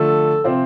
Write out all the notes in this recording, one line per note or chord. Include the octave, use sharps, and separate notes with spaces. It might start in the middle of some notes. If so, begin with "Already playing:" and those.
Already playing: D3 F3 A3 A4
C3 F3 C4 F4 C5